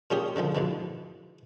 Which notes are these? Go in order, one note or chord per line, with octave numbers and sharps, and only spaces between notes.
A#2 G#3 C#4 G4 G#4
D3 D#3 F3 G#3
A#1 G#2 B2 E3